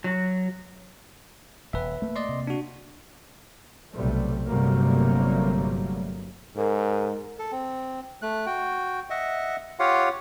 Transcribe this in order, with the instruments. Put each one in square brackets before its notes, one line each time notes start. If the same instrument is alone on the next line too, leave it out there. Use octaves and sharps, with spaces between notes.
[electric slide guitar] F#3
[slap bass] D#1 [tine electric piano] B4 E5
[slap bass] A3 A#3
[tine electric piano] D5 D#5 C6
[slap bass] C3 A#3
[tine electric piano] D4 F#4
[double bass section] B1 C3 G3 A3
G1 C3 F#3 G3 A3 A#3
[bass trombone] G#2 [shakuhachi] A#4
[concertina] A4
C4
A3 F#6
F#4 G5
D#5 E5 F#5
F4 G4 C#5 F5 F#5